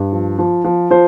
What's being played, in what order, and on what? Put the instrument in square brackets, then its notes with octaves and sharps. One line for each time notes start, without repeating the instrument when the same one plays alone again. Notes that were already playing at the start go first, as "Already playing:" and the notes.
Already playing: [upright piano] G2
F3
F3
F3
F3 C5